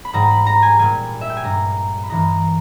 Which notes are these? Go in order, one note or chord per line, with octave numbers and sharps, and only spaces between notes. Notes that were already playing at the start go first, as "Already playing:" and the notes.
B5
G#2 G3 A#5
B5
A#5
G#5
A#2 G3 G#5
E5
G5
G#5
G2 G3 A#5
B5
G2 E3 G#3 A#5